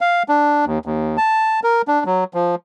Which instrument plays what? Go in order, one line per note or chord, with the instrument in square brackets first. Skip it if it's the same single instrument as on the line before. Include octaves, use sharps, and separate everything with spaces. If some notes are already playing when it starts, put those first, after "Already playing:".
[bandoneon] F5
D4
D#2
D#2
A5
A#4
D4
F#3
F3